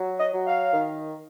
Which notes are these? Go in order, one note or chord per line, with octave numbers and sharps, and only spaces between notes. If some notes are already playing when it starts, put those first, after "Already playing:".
Already playing: F#3
D#5
F#3
F5
D#3